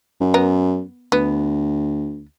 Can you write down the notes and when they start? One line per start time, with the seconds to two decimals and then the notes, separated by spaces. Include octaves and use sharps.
0.21 F#2
0.34 B3 A#4
1.12 D2 B3